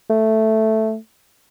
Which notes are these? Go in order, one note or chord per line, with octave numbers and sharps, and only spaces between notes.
A3